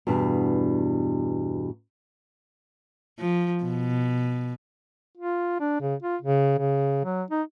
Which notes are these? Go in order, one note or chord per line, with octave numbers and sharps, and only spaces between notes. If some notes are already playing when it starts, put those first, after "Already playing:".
E2 G2 B2 D4
F3
B2
F4
D4
C#3
F4
C#3
C#3
F#3
D#4